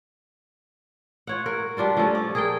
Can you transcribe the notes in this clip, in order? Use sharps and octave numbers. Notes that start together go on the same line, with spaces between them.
F4 C#5 F#5
A#4
G3 D4 F4 F#4
F3 A3 C#4
D5
G#4 A#4 G5